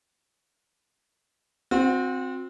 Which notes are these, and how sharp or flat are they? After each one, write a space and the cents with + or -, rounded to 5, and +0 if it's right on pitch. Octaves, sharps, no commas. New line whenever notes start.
C4 +0 F#4 -35